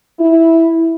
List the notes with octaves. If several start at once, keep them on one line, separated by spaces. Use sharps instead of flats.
E4